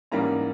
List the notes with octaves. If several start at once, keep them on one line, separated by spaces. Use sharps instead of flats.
G#2 E3 G3 A#3 C#4 A#5